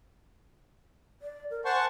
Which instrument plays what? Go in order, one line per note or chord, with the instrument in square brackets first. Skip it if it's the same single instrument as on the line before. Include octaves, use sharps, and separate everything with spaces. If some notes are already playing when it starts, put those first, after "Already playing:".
[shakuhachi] D5
A#4
[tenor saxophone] C5 [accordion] F#5 A5 C#6 [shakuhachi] G#5